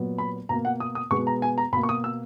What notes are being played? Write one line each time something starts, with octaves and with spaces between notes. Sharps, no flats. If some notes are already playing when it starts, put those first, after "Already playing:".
Already playing: A#2 F#3 B3
B5
B2 A#3 A#5
F#5
D#6
D#6
B2 G#3 B3 C#6
A#5
G#5
A#5
B2 A#3 B5
C#6
D#6
E6